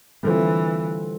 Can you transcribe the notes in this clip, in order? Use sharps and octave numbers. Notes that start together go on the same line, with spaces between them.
G2 D3 E3 A3 C4 F4